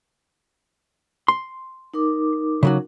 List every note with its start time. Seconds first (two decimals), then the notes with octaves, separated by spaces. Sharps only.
1.28 C6
1.94 D#4 A#4 D6
2.63 C#3 F#3 F#4